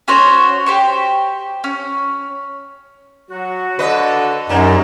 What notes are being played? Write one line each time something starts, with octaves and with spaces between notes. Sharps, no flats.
C#4 F#4 C5 C#5
G4 C5 C#6
C#4
F#3 F#4
D3 B4 D#5
F#2 C3 A#3 D#4 C#5 D5